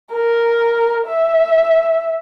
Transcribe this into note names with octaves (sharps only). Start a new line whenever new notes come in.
A#4
E5